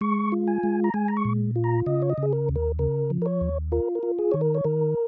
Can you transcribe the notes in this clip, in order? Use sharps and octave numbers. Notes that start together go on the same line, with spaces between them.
G#3 C#6
F4
G#5
G#3
A#5
G#3 G#5
A#5
C#6
A#2
F4
A#5
C#3 D#5
C#5
D#5
C#3
G#4
A#4
D#2
A#4
C#3 A#4
F3
A#4
C#5
D#2
F4 A#4
A#4
F4
G#4
D#3 C#5
A#4
C#5
D#3 A#4